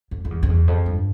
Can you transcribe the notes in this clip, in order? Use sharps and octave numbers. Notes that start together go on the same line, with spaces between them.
F2
F2
E2
F2
E2
F2
G2